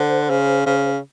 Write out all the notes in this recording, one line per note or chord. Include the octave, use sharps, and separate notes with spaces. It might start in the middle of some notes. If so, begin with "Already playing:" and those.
Already playing: D3 C5
C#3
C#3